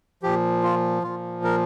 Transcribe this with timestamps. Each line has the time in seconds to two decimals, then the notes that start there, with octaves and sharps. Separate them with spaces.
0.23 A#2 F3 G4
0.63 F4
1.03 A#2 F3 F4
1.44 A#4